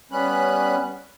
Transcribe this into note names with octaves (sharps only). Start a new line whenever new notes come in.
G3 B3 C#4 B5 F#6